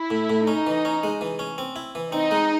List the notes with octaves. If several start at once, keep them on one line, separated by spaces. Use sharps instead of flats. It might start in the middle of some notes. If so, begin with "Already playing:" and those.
Already playing: E4
A2
A2
C#4 D#4
E3
C#4
G#3
E3
C#4
C4
E4
E3
C4 D#4
G#3